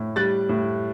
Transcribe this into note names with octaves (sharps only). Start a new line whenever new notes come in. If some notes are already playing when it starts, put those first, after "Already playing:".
Already playing: A2
G3 F#6 A6
A2